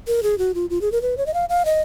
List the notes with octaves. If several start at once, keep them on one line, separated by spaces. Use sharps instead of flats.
A#4
G#4
F#4
F4
F4
G#4
A#4
B4
C#5
D#5
F5
F5
D#5